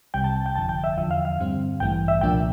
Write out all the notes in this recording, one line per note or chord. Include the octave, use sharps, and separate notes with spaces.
C2 C3 G3 G5
A5
G5
G1 F2 D3 F3 A5
G5
E5
E2 D3 F3 E5
F5
F5
G2 D3 G3 C4
A1 G2 E3 A3 G5
E5
C2 A#2 F3 A#3 D4 G5